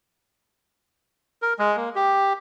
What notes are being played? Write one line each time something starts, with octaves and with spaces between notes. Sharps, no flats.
A#4
G#3
A#3
G4